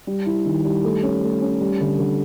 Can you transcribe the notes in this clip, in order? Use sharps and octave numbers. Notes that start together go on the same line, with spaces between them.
G3
E4
D#3
G3
A3
C#4
A3
C#4
G3
D3
D3